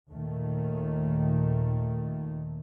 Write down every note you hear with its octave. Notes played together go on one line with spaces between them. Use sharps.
D#2 A#2 D#3 A3